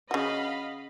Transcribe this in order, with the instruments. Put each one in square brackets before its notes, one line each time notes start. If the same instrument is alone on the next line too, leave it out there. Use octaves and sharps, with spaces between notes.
[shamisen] C#3 F#4 [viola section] D#5 F5 B5